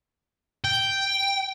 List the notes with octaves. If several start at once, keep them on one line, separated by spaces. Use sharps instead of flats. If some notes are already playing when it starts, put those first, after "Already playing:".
G5